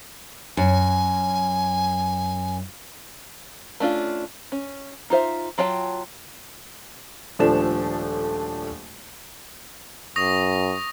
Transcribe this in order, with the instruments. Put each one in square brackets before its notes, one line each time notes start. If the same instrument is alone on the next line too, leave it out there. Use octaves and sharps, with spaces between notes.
[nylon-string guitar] F#2 [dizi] G#5
[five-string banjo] A3 C#4 D4 E4 F4
C#4
D#4 F4 C5 E5
F#3 F4 C#5 G5 A5
[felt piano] D#1 F3 A3 D4 E7
[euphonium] F#2 [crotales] C#6 D#6 A#6